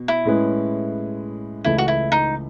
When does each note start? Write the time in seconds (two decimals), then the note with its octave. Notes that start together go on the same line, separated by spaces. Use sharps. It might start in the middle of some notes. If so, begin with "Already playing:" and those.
Already playing: B2
0.08 E4
0.25 A2 G#3 C#4 G#4 B4
1.64 C#2 C#3 E3 A3 E4
1.78 F#4
1.88 E4
2.12 D#4